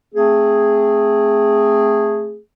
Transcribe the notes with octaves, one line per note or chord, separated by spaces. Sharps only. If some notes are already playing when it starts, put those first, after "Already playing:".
A3 C4 G#4